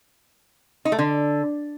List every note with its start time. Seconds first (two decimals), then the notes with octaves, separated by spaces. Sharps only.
0.85 D#4
0.92 A3
0.99 D3